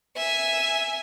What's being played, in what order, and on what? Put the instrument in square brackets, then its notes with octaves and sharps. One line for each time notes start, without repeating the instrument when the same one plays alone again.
[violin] E5 G#5